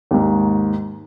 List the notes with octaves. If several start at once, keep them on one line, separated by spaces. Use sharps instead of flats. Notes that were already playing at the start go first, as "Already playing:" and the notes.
D#2 G#2